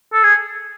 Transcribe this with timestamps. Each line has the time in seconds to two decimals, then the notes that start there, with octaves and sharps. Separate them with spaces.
0.13 A4
0.23 G#4